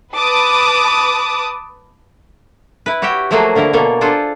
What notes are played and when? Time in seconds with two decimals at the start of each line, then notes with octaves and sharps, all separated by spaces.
0.13 B4 A5 D6 D#6
2.86 E4 B4
3.02 F#4 G4 C#5 E5 G5
3.31 F3 F#3 A3 A#3 F#4 G#4
3.55 D3 A#3 E4 A#4
3.73 B2 A#3 A4 C#5
4.01 D4 F4 G#4 A4 C5